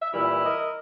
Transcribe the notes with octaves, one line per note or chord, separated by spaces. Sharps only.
E5
A#2 E3 G3 E4
A#4 D#5